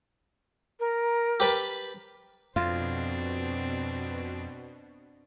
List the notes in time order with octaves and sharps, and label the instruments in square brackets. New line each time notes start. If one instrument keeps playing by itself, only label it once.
[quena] A#4
[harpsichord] G4 B4 A5
[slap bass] F2 [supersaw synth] B2 [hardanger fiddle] C4 D4 [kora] F4